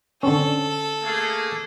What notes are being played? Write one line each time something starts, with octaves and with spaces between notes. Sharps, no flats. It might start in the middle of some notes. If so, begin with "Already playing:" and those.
D3 C4 C#4 A4
A3 A#3 G#4